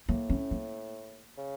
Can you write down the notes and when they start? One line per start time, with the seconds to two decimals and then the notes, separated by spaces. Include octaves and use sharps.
0.09 A2 A#3
0.30 C#4
0.51 A#3
1.38 C#3